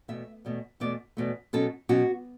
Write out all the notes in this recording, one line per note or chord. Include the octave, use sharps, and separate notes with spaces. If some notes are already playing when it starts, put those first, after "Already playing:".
E2 B2 A3 E5
E2 B2 A3
E2 B2 A3 D5
E2 B2 A3
B2 F#3 C#4 A4
B2 F#3 C#4 F#4